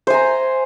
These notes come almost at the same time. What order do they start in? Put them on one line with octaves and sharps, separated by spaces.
C5 G#5 A#5